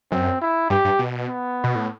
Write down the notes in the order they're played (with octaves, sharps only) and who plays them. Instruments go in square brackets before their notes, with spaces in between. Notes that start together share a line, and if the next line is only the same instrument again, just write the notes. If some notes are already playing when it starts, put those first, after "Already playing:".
[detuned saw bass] F#2 [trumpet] C4
[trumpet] E4
[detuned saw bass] G2 [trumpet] G4
[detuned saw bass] G2
B2
[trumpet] B3
[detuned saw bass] B2
A2